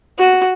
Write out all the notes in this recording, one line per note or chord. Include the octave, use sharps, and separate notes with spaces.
F#4